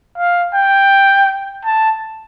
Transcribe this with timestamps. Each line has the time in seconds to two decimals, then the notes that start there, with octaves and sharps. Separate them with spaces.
0.18 F5
0.54 G5
1.65 A5